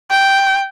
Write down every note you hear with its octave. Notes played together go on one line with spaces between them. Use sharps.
G5